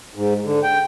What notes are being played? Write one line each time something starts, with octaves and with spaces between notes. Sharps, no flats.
G#2
D3
G5